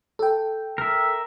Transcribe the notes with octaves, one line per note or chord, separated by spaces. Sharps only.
A4 G5
A#4 E5